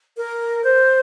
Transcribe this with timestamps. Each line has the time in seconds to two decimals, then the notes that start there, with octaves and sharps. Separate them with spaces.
0.17 A#4
0.64 C5